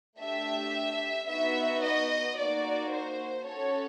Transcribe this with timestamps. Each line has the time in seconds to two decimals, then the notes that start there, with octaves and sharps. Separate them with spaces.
0.20 A3 D4 G4 E5
1.29 B3 D#4 F#4 E5
1.83 D#5
2.37 A#3 D#4 F#4 D5
2.91 C5
3.46 C#4 F#4 A4 C#5